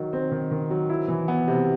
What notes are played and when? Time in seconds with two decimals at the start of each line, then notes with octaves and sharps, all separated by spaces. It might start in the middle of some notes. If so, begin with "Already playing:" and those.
Already playing: D#3 F#3
0.13 C4
0.31 D#3
0.51 D#3
0.70 F#3
0.90 E4
1.08 E3
1.28 B3
1.48 C3